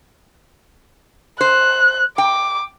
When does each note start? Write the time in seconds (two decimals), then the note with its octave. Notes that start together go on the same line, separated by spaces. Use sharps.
1.41 C5 F#6
2.18 G5 D6